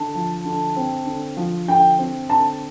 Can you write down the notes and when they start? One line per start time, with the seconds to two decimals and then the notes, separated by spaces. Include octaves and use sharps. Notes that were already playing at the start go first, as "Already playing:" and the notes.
Already playing: D3 A5
0.15 F3
0.45 D3
0.76 C4
1.06 D3
1.37 F3
1.68 D3 G5
1.99 C4
2.29 D3 A5